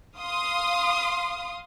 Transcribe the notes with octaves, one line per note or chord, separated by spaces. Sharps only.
F5 C6 D#6